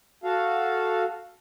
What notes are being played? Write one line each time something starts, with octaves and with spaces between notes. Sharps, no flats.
F#4 A4 F5